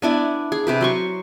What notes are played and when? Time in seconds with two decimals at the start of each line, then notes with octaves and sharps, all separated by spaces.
0.02 B3 D4 E4 G#5
0.52 G#4
0.67 C3 G4 B4
0.81 F#3 C6 C#6